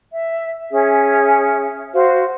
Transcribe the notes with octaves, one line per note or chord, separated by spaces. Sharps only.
E5
C#4 G#4 E5
F#4 C5 F5